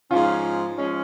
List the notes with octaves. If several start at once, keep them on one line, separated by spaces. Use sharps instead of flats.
G#2 F3 G#3 C#4 F4
F3 G#3 C#4